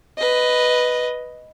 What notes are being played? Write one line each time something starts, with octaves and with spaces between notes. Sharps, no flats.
B4 D#5